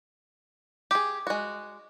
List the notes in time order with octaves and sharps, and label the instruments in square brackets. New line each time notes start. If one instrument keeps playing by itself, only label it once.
[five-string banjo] G4 G#4 [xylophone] D6
[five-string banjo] G#3 F#4